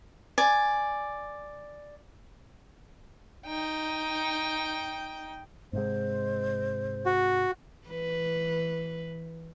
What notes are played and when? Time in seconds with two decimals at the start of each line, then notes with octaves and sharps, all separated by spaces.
0.38 D5 G#5
3.45 D#4 G5
5.73 G#2 C3 G#3 C5
7.06 F#4
7.88 E3 B4